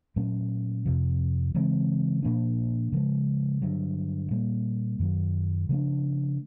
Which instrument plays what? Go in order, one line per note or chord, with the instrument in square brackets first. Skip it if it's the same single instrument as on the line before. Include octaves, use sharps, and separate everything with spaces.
[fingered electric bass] A#2 F#3 A3 C#4
F2 C3 F3
C#3 E3 G#3 C4
A#2 F3 A#3 D4
C#3 F3 G#3
G2 D3 F#3
A#2 G3 A#3
F#2 D#3 F#3
C#3 F3 A3 D4